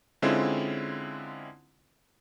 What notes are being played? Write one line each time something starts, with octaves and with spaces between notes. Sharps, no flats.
D3 G#3 C4 C#4 E4 F4